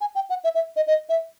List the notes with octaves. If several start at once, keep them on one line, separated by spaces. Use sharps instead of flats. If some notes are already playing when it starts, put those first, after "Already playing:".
G#5
G5
F#5
E5
E5
D#5
D#5
E5